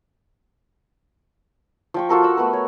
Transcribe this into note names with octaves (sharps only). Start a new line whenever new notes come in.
F3 G5 C#6
F4 F#4 A4 A#4
F#5 E6
A3 B3 F#4 A#4
C#5